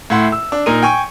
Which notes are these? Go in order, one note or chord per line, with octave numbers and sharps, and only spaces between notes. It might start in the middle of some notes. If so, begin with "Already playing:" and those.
A2 E4 F#5 C6
E6
D4
A#2 D#4 A#4 D#7
G5 G#5 C#6